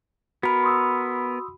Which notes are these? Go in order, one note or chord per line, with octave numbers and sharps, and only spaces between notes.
B3 F#4 A#4 B5
C6 D#6 E6